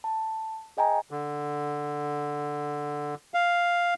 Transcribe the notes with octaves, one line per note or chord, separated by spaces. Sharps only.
A5
G#4 D#5 G5 G#5 A#5
D3
F5